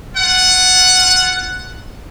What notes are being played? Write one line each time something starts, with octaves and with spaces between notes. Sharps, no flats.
F4 F#5